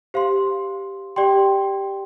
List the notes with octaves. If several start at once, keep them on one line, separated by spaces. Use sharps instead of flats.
G4 C5 F5 C6
G4 D5 G5 C6